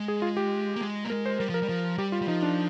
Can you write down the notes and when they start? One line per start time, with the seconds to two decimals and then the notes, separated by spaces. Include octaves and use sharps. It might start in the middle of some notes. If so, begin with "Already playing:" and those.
Already playing: G#3
0.08 G#4
0.22 F4
0.37 G4
0.76 A#3
0.81 G#3
1.04 A#3
1.10 G#3 A#4
1.26 C5
1.39 G3 A#4
1.49 F3
1.54 A#4
1.63 G3
1.69 F3
1.98 G3 G4
2.12 F4
2.22 G3
2.28 F3 D#4
2.42 D4